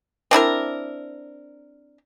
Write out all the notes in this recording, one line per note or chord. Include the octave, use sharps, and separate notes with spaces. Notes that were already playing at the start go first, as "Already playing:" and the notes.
C4 D4 E4 A#4